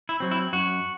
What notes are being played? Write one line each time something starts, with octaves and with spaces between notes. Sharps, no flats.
E4
F#3 C4
E4
F#2 F#4